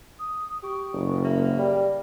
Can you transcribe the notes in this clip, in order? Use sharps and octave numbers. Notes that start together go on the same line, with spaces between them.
D#6
G4 C#6
F#1
A#3 E5
G3